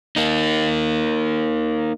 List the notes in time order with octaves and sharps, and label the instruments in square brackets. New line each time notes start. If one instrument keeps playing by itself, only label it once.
[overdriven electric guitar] A#3 D#4